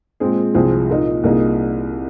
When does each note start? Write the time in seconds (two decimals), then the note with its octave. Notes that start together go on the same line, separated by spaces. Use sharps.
0.20 A#2 G#3 C4 G#4
0.54 C2 C3 F3 C4 G#4
0.90 A#2 A#3 D#4
1.23 C2 A#2 A#3 D#4 G#4